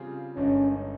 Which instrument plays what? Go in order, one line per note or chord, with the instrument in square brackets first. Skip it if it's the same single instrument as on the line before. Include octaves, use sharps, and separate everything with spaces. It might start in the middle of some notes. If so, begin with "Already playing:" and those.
Already playing: [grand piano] C#3 G3 C4 F4 G#4
[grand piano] G1 G2 D#3 G#3 D#4 [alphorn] C#4